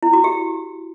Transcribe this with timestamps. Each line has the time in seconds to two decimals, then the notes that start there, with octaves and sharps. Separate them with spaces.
0.03 E4
0.13 F#4
0.24 G4